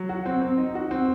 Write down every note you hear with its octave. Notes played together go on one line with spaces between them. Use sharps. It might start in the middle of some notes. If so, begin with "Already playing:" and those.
Already playing: F#3
F#4
C4
C4
D#4
F#4
C4